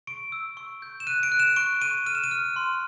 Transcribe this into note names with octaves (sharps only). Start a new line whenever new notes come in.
C#6 D7
E6
C#6
G6
E7
F#6 D#7
D7
F#6
E7
C#6 D7
C#6 D#7
F6 D#7
E7
D#7
F6
C6